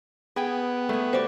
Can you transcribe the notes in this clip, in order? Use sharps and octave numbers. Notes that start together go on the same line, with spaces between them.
B3 G#4 G5
G3 A3 G#4
F#4 G4 C5 D5